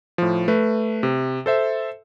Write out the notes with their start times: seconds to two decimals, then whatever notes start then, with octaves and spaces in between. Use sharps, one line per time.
0.18 A2 F3
0.48 A3 B4
1.03 C3
1.46 A4 C5 E5